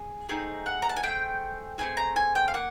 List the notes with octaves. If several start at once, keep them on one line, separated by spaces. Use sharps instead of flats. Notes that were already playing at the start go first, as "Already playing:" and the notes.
Already playing: G#4
A3 C4 D#4 G#4
F#5
A#5
A5
G#5
A3 C4 G#4 G5
A3 C4 D#4 G#4 G#5
A#5
G#5
G5
F5
A#3 F#5